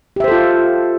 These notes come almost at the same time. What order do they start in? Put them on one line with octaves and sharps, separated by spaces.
G4 E5 C5 A4 F4